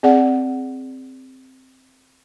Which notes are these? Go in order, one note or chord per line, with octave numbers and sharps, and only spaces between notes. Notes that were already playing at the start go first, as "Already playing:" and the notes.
C4 G#4 D5 F#5